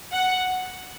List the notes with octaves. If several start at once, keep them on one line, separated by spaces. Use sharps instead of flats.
F#5